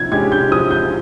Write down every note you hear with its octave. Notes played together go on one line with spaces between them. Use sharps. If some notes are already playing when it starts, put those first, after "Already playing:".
Already playing: F3 G#6
G#3 C#4 G4 G#6
G6
F3 D#6
G6